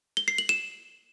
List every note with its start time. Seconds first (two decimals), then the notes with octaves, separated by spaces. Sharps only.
0.17 G7
0.28 C7
0.38 F#7
0.49 E7